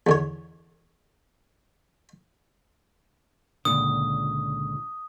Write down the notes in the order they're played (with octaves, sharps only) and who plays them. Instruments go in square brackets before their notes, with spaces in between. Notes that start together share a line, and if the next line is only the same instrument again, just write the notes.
[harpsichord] E2 D3 C#5
[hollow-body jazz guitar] C#2 A#2 D3 [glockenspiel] D#6